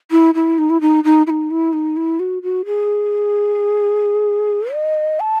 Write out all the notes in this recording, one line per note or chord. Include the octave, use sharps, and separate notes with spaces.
E4
E4
D#4
E4
D#4
D#4
E4
D#4
E4
D#4
E4
F#4
F#4
G#4
D#5
A5